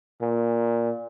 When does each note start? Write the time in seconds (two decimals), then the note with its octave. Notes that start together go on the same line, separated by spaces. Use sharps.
0.22 A#2